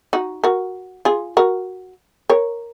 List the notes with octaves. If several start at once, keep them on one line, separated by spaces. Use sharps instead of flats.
D#4 F#4
F#4 A#4
F4 G#4
F#4 A#4
A#4 C#5